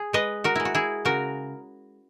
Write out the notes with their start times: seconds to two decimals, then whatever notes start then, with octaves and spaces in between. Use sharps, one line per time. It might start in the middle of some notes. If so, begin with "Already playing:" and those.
Already playing: G#4
0.13 G#3 B4 D#5
0.44 F#4 A#4
0.56 G#3 E4
0.65 F#4
0.75 E4 G#4
1.05 C#3 F#4 A#4